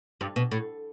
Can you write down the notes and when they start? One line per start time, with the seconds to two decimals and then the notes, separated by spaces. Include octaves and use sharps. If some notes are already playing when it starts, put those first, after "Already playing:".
0.21 G2
0.36 B2
0.51 A2